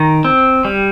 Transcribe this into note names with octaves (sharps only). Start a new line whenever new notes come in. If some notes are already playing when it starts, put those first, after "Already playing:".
Already playing: D#3 A#5
C4
G3